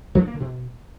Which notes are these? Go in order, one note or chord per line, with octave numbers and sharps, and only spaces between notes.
F3
D4
A#3
D3
B2